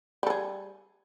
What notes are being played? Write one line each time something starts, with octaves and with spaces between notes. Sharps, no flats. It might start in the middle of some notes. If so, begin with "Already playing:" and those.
G3 G#4 A4